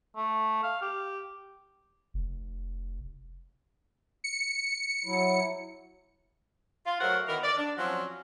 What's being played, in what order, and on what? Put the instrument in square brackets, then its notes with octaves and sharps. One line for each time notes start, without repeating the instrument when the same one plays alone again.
[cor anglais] A3
F5
G4
[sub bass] F1
[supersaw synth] C#7
[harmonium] F#3 E4
[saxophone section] F4
F#3 A3 F#4 A#4 C5 F#5
D#3 E3 B3 A#4
D5
D4
F3 F#3 C4 C#4 F#4